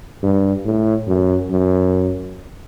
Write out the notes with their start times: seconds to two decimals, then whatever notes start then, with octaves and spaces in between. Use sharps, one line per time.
0.23 G2
0.65 A2
1.08 F#2
1.51 F#2